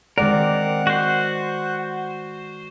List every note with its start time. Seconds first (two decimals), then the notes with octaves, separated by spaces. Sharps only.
0.18 D#3 G#3 C4 A#4 D5 F#5
0.87 F#4 C5